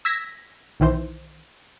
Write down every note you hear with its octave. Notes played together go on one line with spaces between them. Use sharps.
E6 G#6 A#6 B6
B1 D#3 E3 C5